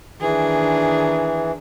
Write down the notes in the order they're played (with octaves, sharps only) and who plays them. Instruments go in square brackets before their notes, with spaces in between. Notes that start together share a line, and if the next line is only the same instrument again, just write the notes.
[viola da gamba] D#3 D4 [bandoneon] E3 [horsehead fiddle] G#4